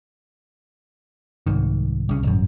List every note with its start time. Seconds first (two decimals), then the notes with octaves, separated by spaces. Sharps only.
1.47 C2 G#2 D#3
2.09 C2 C#3
2.23 D#1 G#1 F#2